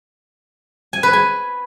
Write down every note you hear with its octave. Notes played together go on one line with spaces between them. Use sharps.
G#5
B4
G#5